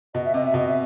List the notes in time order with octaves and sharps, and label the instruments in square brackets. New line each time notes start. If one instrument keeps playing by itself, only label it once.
[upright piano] B2 [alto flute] D#5
[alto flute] E5
[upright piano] C3 [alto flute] D#5
[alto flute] E5
[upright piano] B2 [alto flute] D#5
[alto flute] E5